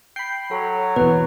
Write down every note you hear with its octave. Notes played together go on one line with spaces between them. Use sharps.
G5 B5 C7
F#3 A4
E2 B2 B4